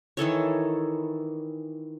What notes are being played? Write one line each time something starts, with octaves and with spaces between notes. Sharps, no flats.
D#3 E3 A4 C#5